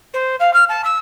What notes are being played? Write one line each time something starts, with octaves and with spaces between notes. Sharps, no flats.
C5
F5
F6
A5
E6